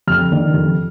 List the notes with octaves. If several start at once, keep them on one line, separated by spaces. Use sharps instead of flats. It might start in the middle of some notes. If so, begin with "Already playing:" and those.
F2 F6
D#3 A#3 D4
F2